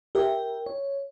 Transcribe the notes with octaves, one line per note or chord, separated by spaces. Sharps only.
G4 A#4 E5 G5
C#5